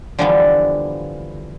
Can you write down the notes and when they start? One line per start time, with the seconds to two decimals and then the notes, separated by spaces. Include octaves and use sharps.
0.19 D3 E3 F3 G3 A#3 B3